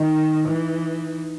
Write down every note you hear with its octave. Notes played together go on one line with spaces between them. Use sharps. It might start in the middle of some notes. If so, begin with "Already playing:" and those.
Already playing: D#3 D#4
E3